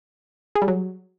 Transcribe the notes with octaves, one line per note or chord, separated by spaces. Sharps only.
G#4
G3
F#3